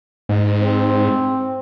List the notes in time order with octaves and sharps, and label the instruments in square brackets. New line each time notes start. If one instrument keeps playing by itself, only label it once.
[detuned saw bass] G#2
[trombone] C4